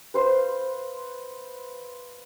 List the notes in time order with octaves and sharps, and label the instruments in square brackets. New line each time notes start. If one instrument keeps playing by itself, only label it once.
[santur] B4 C5 F5